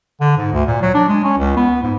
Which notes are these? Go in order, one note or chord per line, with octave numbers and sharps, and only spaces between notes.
D3
G#2
D2
A#2
F#3
D4
G#3
C#4
C#2
B3
G#2